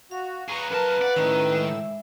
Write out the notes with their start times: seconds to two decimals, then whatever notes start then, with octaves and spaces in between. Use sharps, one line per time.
0.11 F#4 F5
0.50 G#4 B4 A#5 C#6
0.71 F#2 A#4 B4 A5
1.01 D5 F#5
1.16 A2 D#3 C#4 A5 A#5 E6
1.53 G#3 E5